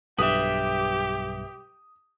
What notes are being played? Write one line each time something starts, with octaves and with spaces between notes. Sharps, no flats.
B1 G2 G4 B4 E5 D#6